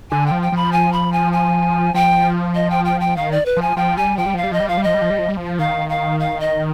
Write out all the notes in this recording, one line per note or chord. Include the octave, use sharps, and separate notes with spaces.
D3 G#5
F3 G5
G5
F3 B5
G#5
B5
G#5
G#5
F3 G5
D#5
G5
G5
G5
D#3 F5
D5
B4
F3
G#5
F3 G5
G3 G#5
F3 G5
G3
F3 F5
G3
F3 D#5
G3
F3 F5
G3
F3 D#5
G3
F3
G3
F3
G3
F3
D#3 F5
F5
F5
D#5